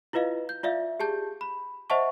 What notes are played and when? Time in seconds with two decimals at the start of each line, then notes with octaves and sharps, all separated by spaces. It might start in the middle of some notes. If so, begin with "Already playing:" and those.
0.13 E4 F4 B4 D#5 F5
0.49 G6
0.63 F4 D5 E5 F5
1.00 G4 G#4 A5 G6
1.41 B5
1.90 C5 D#5 E5 F#5 A5 C#6